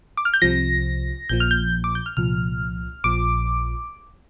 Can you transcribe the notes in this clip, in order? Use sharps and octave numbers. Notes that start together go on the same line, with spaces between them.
D6
F6
G6
C2 C3 F3 A#6
A#1 A#2 F3 G6
F6
G6
D6
G6
F6
C2 A#2 F3 F6
A#1 A#2 F3 D6